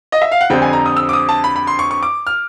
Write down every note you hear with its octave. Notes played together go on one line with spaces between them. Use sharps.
D#5
E5
F5
F#5
F2 D3 G3 C4 G5
G#5
A#5
D#6
E6
D6
D#6
A5
B5
B5
C6
C#6
C#6
D6
F6